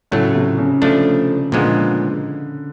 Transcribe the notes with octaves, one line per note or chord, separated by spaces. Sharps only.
A2 C#3 F#3 A3
C3
C#3
F3 A3 D4
A#2 D3 F3 G#3 B3